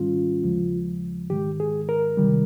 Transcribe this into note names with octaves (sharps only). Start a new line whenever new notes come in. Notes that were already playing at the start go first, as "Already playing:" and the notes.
Already playing: G#2 D#3 G3 C#4 F4
D#2 C#3 F3 G#3
G#2 D#3 G#3 G4
G#4
A#4
C3 D#3 G3